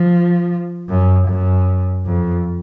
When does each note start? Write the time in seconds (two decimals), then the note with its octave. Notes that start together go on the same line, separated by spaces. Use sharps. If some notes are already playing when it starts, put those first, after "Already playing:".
Already playing: F3
0.89 F#2
1.28 F#2
2.06 F2